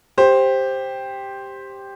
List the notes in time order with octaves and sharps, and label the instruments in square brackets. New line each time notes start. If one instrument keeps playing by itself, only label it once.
[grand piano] G4 C5